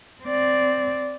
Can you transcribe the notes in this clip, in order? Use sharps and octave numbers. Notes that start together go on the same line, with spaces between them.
C4 D5